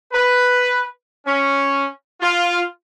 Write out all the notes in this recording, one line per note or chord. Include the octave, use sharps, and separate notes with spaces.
B4
C#4
F4